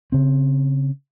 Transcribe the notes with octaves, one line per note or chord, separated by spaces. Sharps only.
C#3 C4